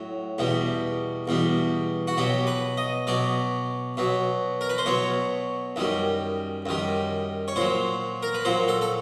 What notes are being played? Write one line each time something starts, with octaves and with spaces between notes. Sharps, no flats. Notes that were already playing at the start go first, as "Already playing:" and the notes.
Already playing: A2 F#3
E2 B2 G3
E2 B2 G3
F#4
B2 F#3 G4
B4
D#5
B2 F#3 D5
B2 F#3
A#4
B4
C5
B2 F#3 C#5
F#2 D#3 G3
F#2 D#3 G3
C#5
A#2 F#3 C5
A#4
B4
A#2 F#3 C5
A4
A4